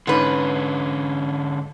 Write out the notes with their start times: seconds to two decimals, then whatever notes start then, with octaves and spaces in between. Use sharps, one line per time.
0.07 G#2 D3 C#4 B4